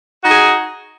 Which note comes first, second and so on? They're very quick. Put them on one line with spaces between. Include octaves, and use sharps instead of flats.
F#4 D#4 G#4